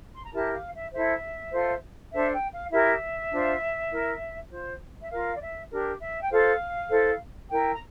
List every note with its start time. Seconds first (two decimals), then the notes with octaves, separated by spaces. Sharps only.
0.14 C6
0.24 A#5
0.32 E4 G4 A#4 A5
0.53 F5
0.73 E5
0.92 E4 A4 C5 E5
1.52 F4 A4 C5
2.12 D4 A4 C5 E5
2.33 G5
2.52 F5
2.71 E4 G4 A#4 E5
3.32 D4 F4 C5
3.91 E4 A#4
4.51 F4 C5
5.01 E5
5.10 F4 A#4 F5
5.34 D5
5.41 E5
5.71 D4 G4 A#4
6.00 E5
6.22 G5
6.31 F4 A4 C5 F5
6.91 E4 A4 C5
7.50 E4 A#4 G5
7.73 A#5